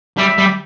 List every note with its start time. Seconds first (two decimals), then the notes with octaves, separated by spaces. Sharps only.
0.18 G3 E5
0.38 G3